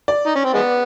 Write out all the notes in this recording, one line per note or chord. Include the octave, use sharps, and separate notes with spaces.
D5
D#4
C#4
C4
G#3 B3